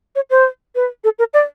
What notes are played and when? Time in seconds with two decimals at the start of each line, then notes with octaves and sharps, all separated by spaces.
0.15 C#5
0.30 C5
0.75 B4
1.04 A4
1.19 A#4
1.34 D5